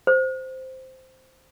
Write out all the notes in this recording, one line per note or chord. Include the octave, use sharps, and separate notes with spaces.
C5